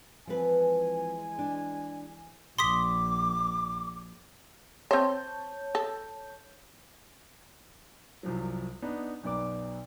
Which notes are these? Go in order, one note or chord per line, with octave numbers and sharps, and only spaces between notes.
E3 F3 G#3 C4 B4 G#5
D4
A#1 C6 D6 D#6 B6
C4 C5 C#5 A5 G6
A4
C2 F#2 F3 F#3
B3 D4 D#4
B1 F#2 B3 D5 D6